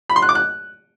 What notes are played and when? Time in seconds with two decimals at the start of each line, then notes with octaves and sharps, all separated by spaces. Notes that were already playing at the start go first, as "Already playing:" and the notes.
0.10 B5
0.16 C6
0.22 F#6
0.29 D6
0.35 F#6